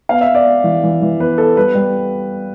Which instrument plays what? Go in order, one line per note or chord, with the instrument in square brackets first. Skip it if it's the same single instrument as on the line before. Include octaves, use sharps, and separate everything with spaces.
[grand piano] B3 F5
E5
B3
D5
B3
E3
E3
E3
B3 B4
B3 A4
G3 B4
G3